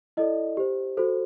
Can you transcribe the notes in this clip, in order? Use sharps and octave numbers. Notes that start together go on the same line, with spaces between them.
E4 A4 D5 D#5
G4 C5
F#4 A4 C5